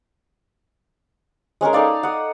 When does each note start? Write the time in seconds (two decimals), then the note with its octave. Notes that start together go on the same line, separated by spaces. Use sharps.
1.61 G#3 C#4 G#4 A#4
1.73 D#4 A4 D5 F5
2.03 F#5 D#6